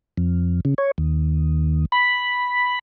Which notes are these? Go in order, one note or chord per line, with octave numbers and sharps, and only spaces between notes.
F2
C#3
C#5
D#2
B5